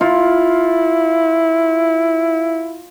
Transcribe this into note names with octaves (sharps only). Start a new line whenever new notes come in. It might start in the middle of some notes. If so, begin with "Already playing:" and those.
E4 F4